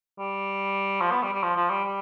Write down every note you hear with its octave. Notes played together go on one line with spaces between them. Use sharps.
G3
F3
B3
G3
G3
F3
F3
G3
G3